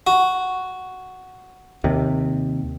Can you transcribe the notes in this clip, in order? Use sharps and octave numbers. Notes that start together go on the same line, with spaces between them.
F#4
D#2 C3